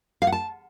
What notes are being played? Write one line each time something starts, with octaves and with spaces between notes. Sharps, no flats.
F5
F#5
A5